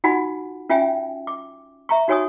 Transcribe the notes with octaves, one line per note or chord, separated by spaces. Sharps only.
D#4 F4 F#4 F#5 G#5 B5
C#4 F4 E5 G5 G#5
D6
E5 A#5 C#6
D#4 F#4 C#5 G#5 C#6 D#6